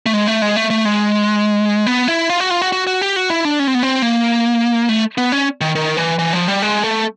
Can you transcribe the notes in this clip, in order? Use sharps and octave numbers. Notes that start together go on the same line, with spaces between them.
A3
G#3
A3
G#3
A3
A3
G#3
B3
E4
F4
F#4
F4
F#4
F#4
F#4
G4
F#4
E4
D4
C#4
C4
B3
C4
A#3
A3
B3
C#4
D#3
D#3
E3
E3
F3
G3
G#3
A3